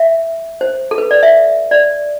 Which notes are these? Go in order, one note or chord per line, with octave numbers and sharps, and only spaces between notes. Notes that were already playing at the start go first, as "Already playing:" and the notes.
Already playing: E5
C5
A4
B4
D5
E5
D5